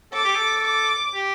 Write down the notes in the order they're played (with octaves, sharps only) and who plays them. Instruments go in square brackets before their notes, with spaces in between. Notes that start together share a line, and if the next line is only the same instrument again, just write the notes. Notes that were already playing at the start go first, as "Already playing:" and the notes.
[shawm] A4 [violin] D6
[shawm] G4
A4
[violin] D6
[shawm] G4